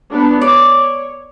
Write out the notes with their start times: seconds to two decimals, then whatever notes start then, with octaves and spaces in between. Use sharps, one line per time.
0.11 B3 D4
0.42 C#5 D5